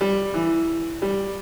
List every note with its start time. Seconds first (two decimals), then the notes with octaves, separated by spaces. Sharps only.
0.01 G3
0.34 E3
1.02 G3